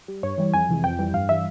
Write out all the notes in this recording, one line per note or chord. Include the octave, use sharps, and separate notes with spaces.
G3
G2 C#5
E3 G3
F2 G#5
C3 E3 G#3
F2 G5
E3 G3
G2 F5
E3 G3 E5